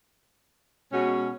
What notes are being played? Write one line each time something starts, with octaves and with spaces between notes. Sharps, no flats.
B2 G#3 C#4 F#4